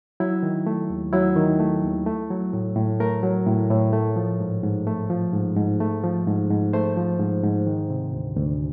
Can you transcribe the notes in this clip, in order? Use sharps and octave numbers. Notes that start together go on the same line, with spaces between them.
F#3 E4
D#3
A3
D#2
F#3 E4
D#3
A3
D#2
A3
F#3
A2
A2
A3 A#4
F#3
A2
A2
A3
F3
G#2
G#2
A3
F3
G#2
G#2
A3
F3
G#2
G#2
A3 C5
F3
G#2
G#2
D#3
C3
D2
D2